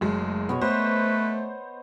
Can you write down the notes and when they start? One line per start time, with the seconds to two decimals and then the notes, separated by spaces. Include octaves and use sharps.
0.01 F#1 G#3 A3
0.49 B2 B3 C#5 D#5
0.61 A3 B4 C5